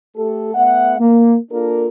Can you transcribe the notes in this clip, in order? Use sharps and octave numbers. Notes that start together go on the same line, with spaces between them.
A3 G4 A4
A3 B3 E5 F#5
A#3
A#3 D4 F4 A4 A#4